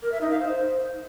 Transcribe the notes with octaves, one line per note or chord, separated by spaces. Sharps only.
A#4
E5
D#4
F5
C5